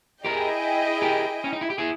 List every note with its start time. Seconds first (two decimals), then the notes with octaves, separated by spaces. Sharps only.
0.25 E4 G4 G#4 A#4 D#5 G5
1.02 G4 A#4
1.44 C#4
1.53 D#4
1.61 E4
1.70 G4
1.78 E4 G#4